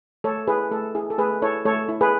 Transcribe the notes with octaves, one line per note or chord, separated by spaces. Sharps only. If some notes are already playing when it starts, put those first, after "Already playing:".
A3 A4 C#5
E4 G#4 B4
A3 A4
E4 G#4
A4
A3 G#4 B4
E4 A4 C#5
A3 A4 C#5
E4
G#4 B4